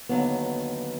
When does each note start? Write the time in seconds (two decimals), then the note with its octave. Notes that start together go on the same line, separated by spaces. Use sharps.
0.09 D#2 D3 F#3 B3